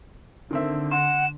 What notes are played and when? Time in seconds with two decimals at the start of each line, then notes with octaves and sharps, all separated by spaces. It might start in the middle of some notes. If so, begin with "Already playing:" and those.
0.51 D3 D#3 C4 E5
0.91 F#5 C6 E7